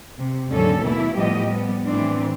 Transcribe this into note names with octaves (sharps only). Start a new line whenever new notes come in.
C3
D#2 G#2 D3 F#3 C#4 A4
B2 E3 A3 A#3 E4
A2 F3 G3 B3 G4 D#5
G3 B3
A2 E3 C4 D4